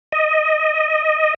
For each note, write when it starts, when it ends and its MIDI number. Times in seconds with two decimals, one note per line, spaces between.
0.12 1.34 75